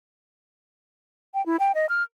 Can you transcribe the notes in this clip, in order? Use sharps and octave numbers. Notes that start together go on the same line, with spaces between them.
G5
E4
G5
D#5
F6